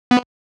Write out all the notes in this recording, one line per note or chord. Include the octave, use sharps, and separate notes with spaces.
B3